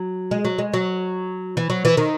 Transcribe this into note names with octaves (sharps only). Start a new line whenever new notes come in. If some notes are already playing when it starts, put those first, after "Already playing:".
Already playing: F#3
G#3
F#3
G#3
F#3
E3
F#3
E3
D#3